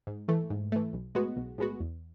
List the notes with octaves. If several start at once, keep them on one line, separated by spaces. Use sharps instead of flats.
G#2
E3 A3
G#2
E3 A3
B1
A2 G#3 B3 F#4
B1
A2 G#3 B3 F#4
E2